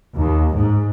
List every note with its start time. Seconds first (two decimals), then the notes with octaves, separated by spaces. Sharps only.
0.15 D#2
0.55 G#2